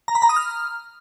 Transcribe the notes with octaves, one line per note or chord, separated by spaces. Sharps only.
A#5
B5
A#5
D#6
F6